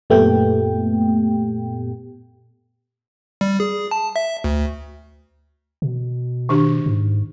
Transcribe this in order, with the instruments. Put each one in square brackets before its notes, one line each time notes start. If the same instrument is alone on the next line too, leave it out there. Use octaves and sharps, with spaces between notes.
[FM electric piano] F#2 A#2 A3 B3 G4 G5
[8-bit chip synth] G3
G#4
A5
E5
D2
[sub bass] B2
[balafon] D#3 D4 G4
[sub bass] G#2